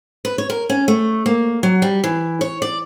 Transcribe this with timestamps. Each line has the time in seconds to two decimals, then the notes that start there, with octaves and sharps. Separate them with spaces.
0.25 B4
0.38 C#5
0.50 A#4
0.70 C#4
0.88 A3
1.26 A#3
1.63 F#3
1.82 G3
2.04 E3
2.41 C#5
2.62 D5